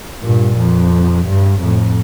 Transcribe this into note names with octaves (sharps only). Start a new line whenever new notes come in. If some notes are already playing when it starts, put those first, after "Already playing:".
G2 A#2
F2
G2
F2 A2